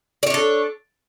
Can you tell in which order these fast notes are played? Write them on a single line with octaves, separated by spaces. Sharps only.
D5 C#5 D4 A4